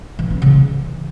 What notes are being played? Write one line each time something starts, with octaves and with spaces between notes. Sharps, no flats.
E3
C#4
C#3
E3